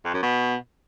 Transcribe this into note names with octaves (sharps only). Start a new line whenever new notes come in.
F2
F#2
B2